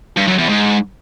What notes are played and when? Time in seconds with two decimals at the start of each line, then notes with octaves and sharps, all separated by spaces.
0.17 G2
0.27 F#2
0.38 E2
0.49 G#2